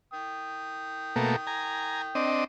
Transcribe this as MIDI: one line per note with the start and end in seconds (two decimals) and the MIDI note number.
0.13 2.37 79
0.13 2.37 87
1.16 1.36 47
1.16 1.36 57
1.16 1.36 58
1.47 2.02 80
1.47 2.02 82
2.15 2.44 60
2.15 2.44 62
2.15 2.44 75